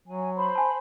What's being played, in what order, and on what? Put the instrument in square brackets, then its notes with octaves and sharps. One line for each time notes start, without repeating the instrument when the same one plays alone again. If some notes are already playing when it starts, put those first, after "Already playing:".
[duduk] F#3 [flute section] G#5
[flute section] C5 B5 C6
[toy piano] G#5 A5